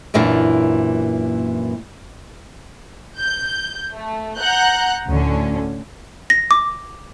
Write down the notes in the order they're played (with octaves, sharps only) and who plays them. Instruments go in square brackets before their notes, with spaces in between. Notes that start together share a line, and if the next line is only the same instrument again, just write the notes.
[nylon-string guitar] F#2 A#2 E3 A#3 D4
[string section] G6
A3
F#5 A#5 F#6 G6
D2 A2 D3 C#4
[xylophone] A#6
D6